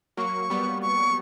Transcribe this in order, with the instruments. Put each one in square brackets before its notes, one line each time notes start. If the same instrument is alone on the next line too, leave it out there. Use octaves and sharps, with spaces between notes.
[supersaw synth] F#3 A#3 [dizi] C#6
[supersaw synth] G3 B3
[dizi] C#6